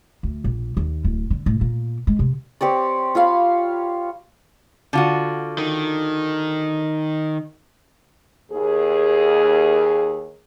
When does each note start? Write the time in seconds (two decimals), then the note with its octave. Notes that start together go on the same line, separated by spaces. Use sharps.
0.23 D2
0.44 A#1
0.77 D#2
1.04 D1
1.30 D3
1.46 A2
1.61 A#2
2.07 G#3
2.19 C3
2.61 C4 G4 C#5 D5
3.15 F4 C#5 F5 B5
4.93 D3 F4 F#4
5.58 D#3
8.51 D#2 G#4